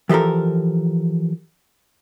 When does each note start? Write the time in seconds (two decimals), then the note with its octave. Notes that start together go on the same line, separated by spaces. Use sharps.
0.09 E3 F3 G4 A4 A#4